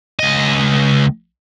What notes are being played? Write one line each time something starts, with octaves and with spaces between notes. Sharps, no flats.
C#2 D#5